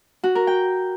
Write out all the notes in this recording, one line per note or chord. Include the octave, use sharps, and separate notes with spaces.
F#4
A#4
G5